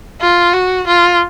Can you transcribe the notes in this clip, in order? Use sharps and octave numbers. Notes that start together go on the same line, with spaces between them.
F4
F#4
F4